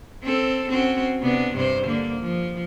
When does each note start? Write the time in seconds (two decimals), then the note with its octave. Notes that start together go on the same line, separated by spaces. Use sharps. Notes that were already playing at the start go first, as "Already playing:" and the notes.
0.23 C4 A4
0.70 C4 C#4 F#4
1.22 C3 B3 D4
1.55 G2 C3 C5
1.86 D3 A#3
2.21 F3